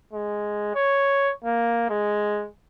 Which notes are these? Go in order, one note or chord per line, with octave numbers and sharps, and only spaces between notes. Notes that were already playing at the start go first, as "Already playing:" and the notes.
G#3
C#5
A#3
G#3